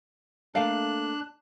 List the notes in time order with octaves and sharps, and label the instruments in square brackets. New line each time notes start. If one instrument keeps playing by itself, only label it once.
[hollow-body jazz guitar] A3 A#3 A4 [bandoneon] D4 F#6 [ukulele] F5